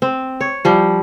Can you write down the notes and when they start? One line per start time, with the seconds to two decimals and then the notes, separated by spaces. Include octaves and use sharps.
0.02 C4
0.41 C#5
0.65 F3 G3